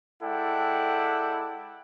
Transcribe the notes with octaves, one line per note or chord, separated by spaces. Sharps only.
G#3 E4 A4 D5 F#5 G5